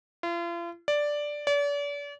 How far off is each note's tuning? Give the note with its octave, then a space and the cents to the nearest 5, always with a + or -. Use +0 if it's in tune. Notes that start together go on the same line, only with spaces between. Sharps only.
F4 -40
D5 +0
D5 -40